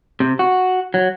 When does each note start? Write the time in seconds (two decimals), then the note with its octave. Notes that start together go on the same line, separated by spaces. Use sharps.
0.20 C3
0.39 F#4
0.94 F#3